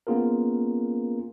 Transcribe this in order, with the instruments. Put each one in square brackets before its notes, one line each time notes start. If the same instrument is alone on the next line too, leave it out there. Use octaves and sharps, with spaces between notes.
[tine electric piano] A#3 B3 C#4 F4 G#4 A#4